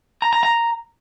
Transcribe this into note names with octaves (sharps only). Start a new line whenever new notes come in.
A#5
A#5
A#5